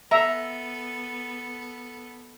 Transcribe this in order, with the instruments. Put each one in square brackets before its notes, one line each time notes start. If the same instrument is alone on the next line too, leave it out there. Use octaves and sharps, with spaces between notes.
[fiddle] B3 A4 [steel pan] E5 A#5